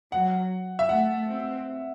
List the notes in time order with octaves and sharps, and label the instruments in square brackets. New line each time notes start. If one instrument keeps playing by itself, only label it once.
[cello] F#3 [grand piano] F#5
[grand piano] E5
[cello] A3 [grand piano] F#5
[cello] C4